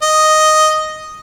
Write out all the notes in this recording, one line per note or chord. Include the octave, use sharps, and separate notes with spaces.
D#5